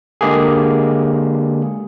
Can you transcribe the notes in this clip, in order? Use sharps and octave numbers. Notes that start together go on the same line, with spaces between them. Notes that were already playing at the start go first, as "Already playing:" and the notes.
D3 G#3 A#3 G4 G#4